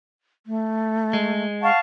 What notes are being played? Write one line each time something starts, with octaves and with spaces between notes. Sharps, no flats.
A3
G#3
F5 F#5 A5 C#6